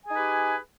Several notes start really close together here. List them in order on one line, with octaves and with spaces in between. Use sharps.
G#5 G#4 D#4 B4 G4